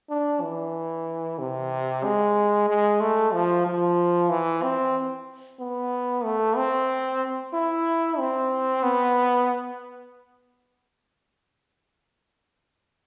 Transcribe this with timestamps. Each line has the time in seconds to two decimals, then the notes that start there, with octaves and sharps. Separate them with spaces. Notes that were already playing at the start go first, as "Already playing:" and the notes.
0.10 D4
0.42 E3
1.39 C3
2.04 G#3
2.68 G#3
3.01 A3
3.33 F3
3.66 F3
4.30 E3
4.63 C4
5.60 B3
6.24 A3
6.57 C4
7.54 E4
8.19 C4
8.83 B3